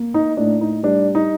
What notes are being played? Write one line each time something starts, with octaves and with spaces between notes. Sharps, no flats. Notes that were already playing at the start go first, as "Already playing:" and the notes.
Already playing: A#3
D#4
A2 D4
D#4
G3 D4
D#4